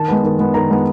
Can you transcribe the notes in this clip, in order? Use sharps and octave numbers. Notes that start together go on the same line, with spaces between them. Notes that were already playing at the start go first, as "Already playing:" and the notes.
Already playing: D#3 A5
G#3 B3
D#3
G#3 B3
D#3 A#5
G#3 B3